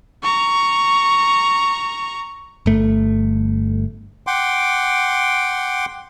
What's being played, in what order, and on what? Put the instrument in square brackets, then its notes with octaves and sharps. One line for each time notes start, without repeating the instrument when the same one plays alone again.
[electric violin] A#5 C#6
[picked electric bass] G1 A3
[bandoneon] F#5 G5 C6 D6